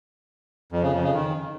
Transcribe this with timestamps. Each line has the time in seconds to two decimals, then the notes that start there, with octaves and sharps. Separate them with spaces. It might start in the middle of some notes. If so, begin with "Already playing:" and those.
0.72 F2
0.83 C#3
0.93 F2
1.04 C#3
1.14 D#3